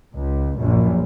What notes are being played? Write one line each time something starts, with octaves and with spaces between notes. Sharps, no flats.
C#2
A#1 F#2